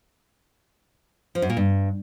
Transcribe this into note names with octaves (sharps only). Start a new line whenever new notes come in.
F3
F#2
A#2
G2